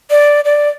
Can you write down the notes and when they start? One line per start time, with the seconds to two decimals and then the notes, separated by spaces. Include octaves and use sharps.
0.10 D5
0.45 D5